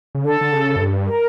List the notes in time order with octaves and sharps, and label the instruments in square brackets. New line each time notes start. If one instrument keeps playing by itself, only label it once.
[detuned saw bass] C#3
[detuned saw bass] D3 [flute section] A4
[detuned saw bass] D3
C#3
F#2
G2
[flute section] A#4